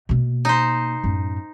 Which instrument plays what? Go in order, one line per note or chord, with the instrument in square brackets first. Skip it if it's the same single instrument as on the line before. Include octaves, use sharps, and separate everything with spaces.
[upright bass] B2 A#3
[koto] D#4 C5
[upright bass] F#2 A2